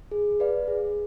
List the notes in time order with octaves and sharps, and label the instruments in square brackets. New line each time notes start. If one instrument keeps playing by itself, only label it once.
[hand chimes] G#4
B4 D5 F5
G#4